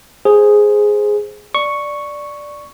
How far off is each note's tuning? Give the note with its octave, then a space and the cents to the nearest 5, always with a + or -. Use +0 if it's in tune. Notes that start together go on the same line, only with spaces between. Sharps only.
G#4 +0 C5 +0
D5 +0 C#6 +0